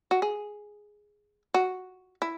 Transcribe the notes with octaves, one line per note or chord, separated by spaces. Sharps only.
F#4
G#4
F#4
E4